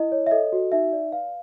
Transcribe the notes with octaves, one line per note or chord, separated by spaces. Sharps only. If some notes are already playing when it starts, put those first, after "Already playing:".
Already playing: E4 D#5
C#5
E5
A4 D#5
F#4
D#4 E5
D5
B4 F5